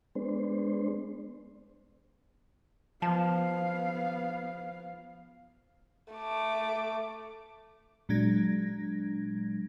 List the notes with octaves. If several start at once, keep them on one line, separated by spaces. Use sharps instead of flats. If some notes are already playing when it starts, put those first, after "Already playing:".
G#3 B3 D4 C5
F3 B3 F5 A5
A3 D6
A#2 F#3 G#3 D4 G#6 A#6